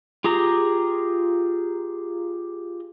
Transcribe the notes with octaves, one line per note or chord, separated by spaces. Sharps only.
F4 G4 G#4 A#5